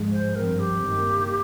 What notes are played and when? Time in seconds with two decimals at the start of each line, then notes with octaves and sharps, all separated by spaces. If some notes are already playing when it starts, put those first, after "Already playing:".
Already playing: G#2 F3 G#3
0.12 C5
0.35 G2 F3 C4 A#4
0.59 G4
0.83 G2 D#3 A#3